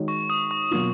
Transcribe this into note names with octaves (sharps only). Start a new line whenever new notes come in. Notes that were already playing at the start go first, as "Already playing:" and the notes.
Already playing: D#3 G#3 D#4 F#4 C#5
C#6
D#6
C#6
B2 F#3 A#3 F4 D#6